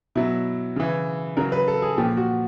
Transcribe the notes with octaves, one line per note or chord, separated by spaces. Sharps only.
B2 F#3 E4
C#3 E3
C#3 F#3 A#4
B4
A4
G#4
A#2 F3 G4
F#4